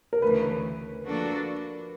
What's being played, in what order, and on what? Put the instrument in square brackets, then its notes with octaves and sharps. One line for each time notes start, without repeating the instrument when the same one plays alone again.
[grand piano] A#4
[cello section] D2 C#3 E3 A3 [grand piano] B4
[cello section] F3 A#3 D4 F#4 A4